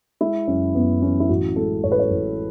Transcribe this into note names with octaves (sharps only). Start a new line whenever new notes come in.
G#3 E4
F#1 C#4
F#1 B3
E3 C#4
E4
A1 F#4
G#3 A4
A1 C#5
B4
C#5
A1